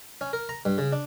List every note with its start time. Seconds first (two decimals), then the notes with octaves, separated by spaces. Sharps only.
0.21 C#4
0.33 A#4
0.49 A#5
0.65 G2
0.78 C#3
0.92 D4